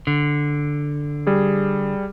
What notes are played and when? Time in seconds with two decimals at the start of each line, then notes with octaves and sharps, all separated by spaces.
0.07 D3
1.27 G3 G#4